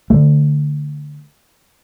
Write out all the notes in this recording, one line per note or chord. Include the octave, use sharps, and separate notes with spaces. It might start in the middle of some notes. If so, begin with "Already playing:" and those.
D3 A3